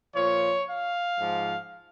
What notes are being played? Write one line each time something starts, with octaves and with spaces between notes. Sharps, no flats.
A#2 F3 C#5
F5
G#2 F3